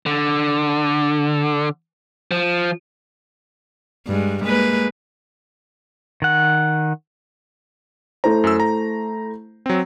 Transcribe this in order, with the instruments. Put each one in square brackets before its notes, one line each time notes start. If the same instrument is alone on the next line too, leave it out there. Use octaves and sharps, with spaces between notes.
[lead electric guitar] D3
F3
[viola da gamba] G2 G#3
G#3 A#3 B4
[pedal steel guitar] D#3 F#5
[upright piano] A3 E4 C5 [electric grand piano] A#5
[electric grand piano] F#2 E6
A#5
F#3 C4